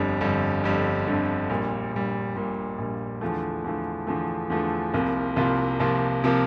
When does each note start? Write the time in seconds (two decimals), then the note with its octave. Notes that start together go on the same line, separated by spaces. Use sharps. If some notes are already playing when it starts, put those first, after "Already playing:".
Already playing: G1 F2 D3 G3
0.21 G1 F2 D3 G3
0.64 G1 F2 D3 G3
1.06 G1 F2 D3 G3
1.50 A#1 A#2 G3
1.92 A#1 A#2 G3
2.35 A#1 A#2 G3
2.78 A#1 A#2 G3
3.21 E2 D3 F3 A3
3.64 E2 D3 F3 A3
4.07 E2 D3 F3 A3
4.50 E2 D3 F3 A3
4.93 C2 C3 F3 A#3 F4
5.36 C2 C3 F3 A#3 F4
5.79 C2 C3 F3 A#3 F4
6.24 C3 F3 A#3 F4